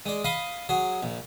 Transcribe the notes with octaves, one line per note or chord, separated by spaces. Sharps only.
G#3 D5
D#5 F5 B5
F#3 G#4
A#1